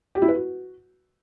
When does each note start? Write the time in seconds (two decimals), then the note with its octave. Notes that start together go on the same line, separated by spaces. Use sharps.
0.15 G4
0.22 E4
0.29 B4
0.35 F#4